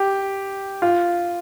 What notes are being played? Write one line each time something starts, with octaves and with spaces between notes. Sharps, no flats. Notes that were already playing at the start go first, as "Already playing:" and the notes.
Already playing: G4
F4